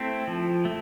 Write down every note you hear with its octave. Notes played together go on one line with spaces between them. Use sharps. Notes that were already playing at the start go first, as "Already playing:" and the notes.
Already playing: A3 C4 E4
F3
A3